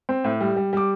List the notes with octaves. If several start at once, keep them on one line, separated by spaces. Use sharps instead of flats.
C4
A2
G3
G3
G3 D6